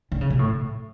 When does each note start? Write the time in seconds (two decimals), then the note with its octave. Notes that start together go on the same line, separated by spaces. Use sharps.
0.12 D3
0.21 C#3
0.30 B2
0.39 A2